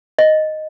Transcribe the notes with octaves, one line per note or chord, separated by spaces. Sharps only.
D#5